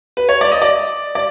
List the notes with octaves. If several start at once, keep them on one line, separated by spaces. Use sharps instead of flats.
B4
C#5
D5
D#5
D5
D5